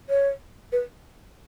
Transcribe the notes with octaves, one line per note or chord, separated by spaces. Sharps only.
C#5
B4